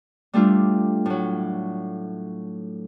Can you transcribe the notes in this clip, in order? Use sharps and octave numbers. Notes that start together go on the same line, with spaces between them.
G3 A3 D4 F4
A2 F#3